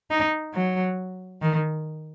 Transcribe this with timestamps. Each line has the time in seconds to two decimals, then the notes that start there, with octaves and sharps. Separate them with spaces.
0.11 D#4
0.54 F#3
1.42 D#3